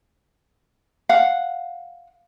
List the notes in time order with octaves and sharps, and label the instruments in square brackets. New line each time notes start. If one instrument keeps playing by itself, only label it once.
[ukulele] F5 F#5